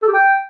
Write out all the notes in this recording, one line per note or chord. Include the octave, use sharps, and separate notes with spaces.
A4
G4
G5